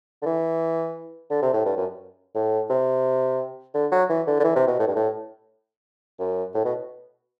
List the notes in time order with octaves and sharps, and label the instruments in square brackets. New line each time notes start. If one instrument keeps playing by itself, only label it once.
[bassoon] D3
E3
D3
C3
A2
G2
F#2
A2
C3
D3
F#3
E3
D3
D3
E3
C3
B2
A2
G2
A2
F#2
A2
B2